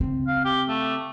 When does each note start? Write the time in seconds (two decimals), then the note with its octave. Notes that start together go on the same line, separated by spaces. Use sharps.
0.01 C#3 C4
0.28 F5
0.45 G4
0.68 A3